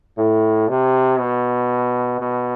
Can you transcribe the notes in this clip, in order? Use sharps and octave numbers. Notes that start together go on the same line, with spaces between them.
A2
C3
B2
B2